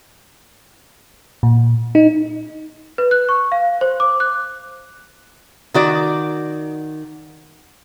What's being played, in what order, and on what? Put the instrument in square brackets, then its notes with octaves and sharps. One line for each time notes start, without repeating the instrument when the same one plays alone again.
[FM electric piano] A#2
D#4
[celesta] B4
F#6
C#6
F5
C5
D6
F#6
[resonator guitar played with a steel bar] D#3 F#4 D5